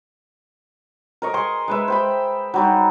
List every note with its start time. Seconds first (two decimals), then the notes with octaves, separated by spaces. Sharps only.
1.22 A#4 D#5 C#6
1.34 G#4 C6 C#6
1.68 G#3 B4 E5
1.88 C5 G5 B5
2.54 F#3 G3 D#4